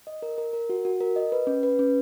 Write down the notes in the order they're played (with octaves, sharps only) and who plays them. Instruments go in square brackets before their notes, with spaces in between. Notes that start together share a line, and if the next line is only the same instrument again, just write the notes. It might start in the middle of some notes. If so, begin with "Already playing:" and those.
[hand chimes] D#5
A#4
A#4
A#4
F#4
F#4
A#4
D#5
B4
C#4
B4
C#4